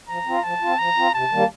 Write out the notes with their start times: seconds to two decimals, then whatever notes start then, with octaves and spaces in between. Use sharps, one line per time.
0.09 F3 A#5
0.26 C4 F4
0.44 F3 A5
0.62 C4 F4
0.79 F3 A#5
0.97 C4 F4
1.14 C3 A5
1.31 D#3 G3 A#3